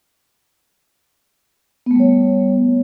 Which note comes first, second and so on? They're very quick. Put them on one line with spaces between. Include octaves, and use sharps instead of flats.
B3 A3 G3 C#5